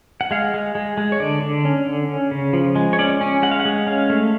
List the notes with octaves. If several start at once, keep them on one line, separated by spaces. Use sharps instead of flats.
F#5
G#3 F5
G#3
G#3
G#3
C#5
D3 D5
D3
C#4
D3
C#4
C#3
F3
G#3
C#5
C#4 D5
C#4
G#3 F#5
F5
F#5
G#3
C#4 F5
A3